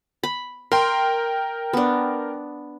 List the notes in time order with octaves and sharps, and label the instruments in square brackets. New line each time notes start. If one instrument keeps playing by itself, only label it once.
[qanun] B5
[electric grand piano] A#4 G5 [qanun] C6
[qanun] B3 D4